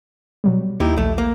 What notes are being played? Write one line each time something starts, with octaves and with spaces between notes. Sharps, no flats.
B2 F#3 G3
D#2 D#4 E4 G4
A#1 A3
A#3